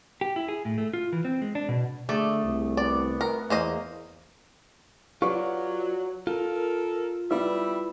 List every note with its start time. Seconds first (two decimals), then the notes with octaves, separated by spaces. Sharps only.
0.21 G4
0.36 E4
0.48 G#4
0.65 A2
0.78 A3
0.93 F4
1.13 E3
1.25 C4
1.42 G#3
1.55 D4
1.69 B2
2.09 D3 A3 G#4 D5
2.44 C2
2.77 B3 D5
3.21 A#4
3.50 E2 A#3 C5 D#5
5.22 F#3 F4 G4 B4 D5
6.27 F4 A4 A#4
7.31 G3 B3 E4 B4 E5